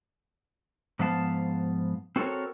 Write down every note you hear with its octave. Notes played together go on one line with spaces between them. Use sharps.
G#2 F3 B3 F5 A5
C4 F#4 A4 A#4 C#5